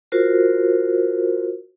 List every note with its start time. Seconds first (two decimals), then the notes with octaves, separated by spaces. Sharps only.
0.12 F4 F#4 A#4 C5